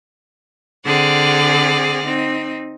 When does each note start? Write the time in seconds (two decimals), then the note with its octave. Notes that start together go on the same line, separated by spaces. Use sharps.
0.85 D3 C4 G#4 D5 F#5 F6
2.05 C4 D#4